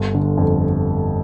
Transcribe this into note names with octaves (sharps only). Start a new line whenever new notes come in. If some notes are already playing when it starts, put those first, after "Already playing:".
Already playing: G1
D3
F2